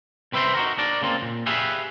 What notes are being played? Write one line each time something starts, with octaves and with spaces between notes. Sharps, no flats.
C2 C4 B4 E5 G5 C6
D#4 F#4 A#4
D4 A#4 D5
C#3 A#3 C4 F4
A#2
G4 G#4 B4 E5 F5